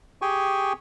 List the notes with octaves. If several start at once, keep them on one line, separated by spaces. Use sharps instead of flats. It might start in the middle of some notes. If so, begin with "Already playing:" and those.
G4 G#4 G5 G#5 C#6